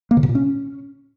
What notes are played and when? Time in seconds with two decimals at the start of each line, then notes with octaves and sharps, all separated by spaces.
0.11 A#3
0.17 C#3
0.23 B2
0.29 A#2
0.35 C#4